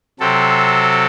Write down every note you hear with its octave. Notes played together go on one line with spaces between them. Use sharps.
C3 F#3 C4 A4